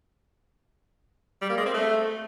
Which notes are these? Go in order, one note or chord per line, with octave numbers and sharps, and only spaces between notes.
G3
A#3
G#3
C4
A3